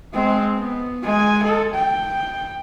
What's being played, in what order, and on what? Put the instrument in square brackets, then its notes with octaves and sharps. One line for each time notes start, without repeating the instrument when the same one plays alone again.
[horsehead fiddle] G#3 C4
B3
G#3 G#5
A4
G5